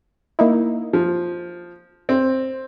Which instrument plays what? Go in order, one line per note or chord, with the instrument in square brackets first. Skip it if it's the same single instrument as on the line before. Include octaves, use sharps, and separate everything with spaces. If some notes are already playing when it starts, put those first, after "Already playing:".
[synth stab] A#3 D#4 E4
[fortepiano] F3
C4